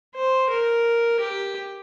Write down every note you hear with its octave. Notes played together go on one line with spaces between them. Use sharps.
C5
A#4
G4